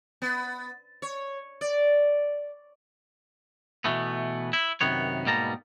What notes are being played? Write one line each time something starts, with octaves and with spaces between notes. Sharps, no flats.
B3
C#5
D5
B2 E3 A3 B3
E4
F#2 C3 D#3 B3 C#5
G#2 B2 G3 A#3 A5 A#5